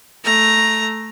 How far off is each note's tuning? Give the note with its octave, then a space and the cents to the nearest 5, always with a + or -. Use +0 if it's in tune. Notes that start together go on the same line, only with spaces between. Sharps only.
A3 +0 A#5 +5